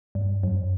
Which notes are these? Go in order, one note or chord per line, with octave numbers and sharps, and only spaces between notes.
G2
F#2